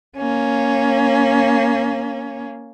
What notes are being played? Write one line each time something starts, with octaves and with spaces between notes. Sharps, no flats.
A#3 C#4